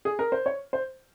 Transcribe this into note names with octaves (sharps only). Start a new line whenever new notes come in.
G#4
A#4
C5
C#5
C5